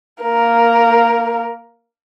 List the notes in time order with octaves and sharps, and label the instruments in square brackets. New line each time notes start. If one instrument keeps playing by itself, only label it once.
[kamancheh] A#3 A#4